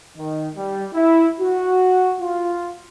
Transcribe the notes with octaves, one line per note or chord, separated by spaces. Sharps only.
D#3
G3
E4
F#4
F4